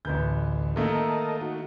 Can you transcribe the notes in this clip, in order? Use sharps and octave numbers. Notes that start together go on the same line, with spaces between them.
A1 D2 B4 G6
D#3 A3 A#3 A4 A#4 D#5
D#4 F#4